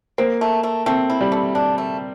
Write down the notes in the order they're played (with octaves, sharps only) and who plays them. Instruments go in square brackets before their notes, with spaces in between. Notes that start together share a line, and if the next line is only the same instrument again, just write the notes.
[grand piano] A#3 [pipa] C4
[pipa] A3
A3
[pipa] A3 [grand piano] C4
[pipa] E4
[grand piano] G3
[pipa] A3
D4
A3